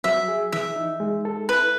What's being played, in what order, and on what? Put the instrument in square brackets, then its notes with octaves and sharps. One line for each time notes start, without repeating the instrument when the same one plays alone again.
[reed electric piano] F#3 [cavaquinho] E5
[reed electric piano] G#4
[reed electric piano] E3 [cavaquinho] E5
[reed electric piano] D#4
G#3
A4
[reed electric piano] E4 [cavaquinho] B4